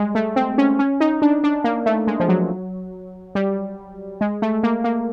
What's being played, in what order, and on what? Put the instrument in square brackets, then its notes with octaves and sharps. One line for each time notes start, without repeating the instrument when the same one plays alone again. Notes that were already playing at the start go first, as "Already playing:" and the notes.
Already playing: [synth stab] G3 G#3
A3
C4
C#4
C#4
D#4
D4
D4
A#3
A3
G#3
F3
F#3
G3
G#3
A3
A#3
A#3